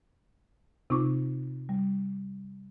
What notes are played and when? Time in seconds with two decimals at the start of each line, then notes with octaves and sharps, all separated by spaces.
0.90 C3 C4 D#4 F4 C#6 D6
1.69 G3